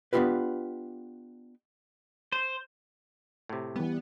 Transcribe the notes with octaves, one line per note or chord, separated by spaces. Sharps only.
B3 D4 D#4 F4 G4 B4
C5
A2 C3
E3 G3 B3